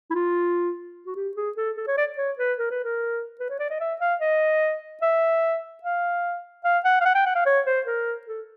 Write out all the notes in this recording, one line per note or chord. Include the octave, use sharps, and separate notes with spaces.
E4
F4
F#4
G4
G#4
A4
A4
C#5
D5
C#5
B4
A#4
B4
A#4
B4
C#5
D5
D#5
E5
F5
D#5
E5
F5
F5
F#5
F5
F#5
G5
F#5
F5
C#5
C5
A#4
A4